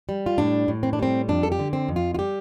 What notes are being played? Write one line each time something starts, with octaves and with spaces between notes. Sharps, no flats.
G3
F4
A2 D4
A2
C4
D4
G3 C4
F2 D4
A4
G4
D3
C4
F2
F4
F4
G3 G4